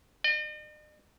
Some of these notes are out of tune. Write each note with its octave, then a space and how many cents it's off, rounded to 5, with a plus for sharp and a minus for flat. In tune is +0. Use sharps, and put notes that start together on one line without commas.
D#5 -45